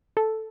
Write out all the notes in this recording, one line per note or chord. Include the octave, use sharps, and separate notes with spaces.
A4